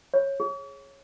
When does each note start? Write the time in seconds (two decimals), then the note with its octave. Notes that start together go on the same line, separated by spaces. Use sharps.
0.14 C#5
0.40 G#4